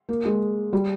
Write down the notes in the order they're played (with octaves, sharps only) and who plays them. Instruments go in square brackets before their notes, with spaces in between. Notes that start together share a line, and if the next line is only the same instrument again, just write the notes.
[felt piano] A#3
G#3
G3